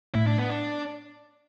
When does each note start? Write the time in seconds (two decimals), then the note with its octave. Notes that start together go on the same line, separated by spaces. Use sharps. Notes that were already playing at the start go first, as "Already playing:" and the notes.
0.15 A2 E4
0.27 D4
0.38 B3
0.50 D4